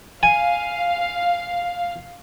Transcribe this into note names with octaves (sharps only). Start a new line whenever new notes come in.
F5 G#5